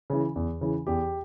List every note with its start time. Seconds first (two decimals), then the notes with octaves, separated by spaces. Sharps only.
0.10 C#3 E3
0.36 E2
0.61 C#3 E3
0.87 E2 G4